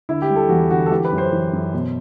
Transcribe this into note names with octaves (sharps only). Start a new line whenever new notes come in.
D3 E4
G4
G3
A4
E2 F#4
D3 F#4
A4
E3 G4
B4
F#2
C5
E3
F#2
B2